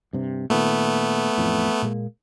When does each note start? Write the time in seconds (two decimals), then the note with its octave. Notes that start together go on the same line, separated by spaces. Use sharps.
0.13 G2 C3
0.50 A#2 D#3 A3 B3
1.38 A1 F2 A2
1.82 A#2 G#3 A#3